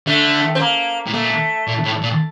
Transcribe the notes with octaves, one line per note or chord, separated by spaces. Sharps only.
D3 A3
C4
A#3
A2
A#2 A3
A#2
A2
A#2